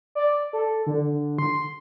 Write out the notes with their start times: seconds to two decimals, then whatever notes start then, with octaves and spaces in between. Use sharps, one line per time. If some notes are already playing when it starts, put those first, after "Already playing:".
0.15 D5
0.53 A4
0.86 D3
1.39 C6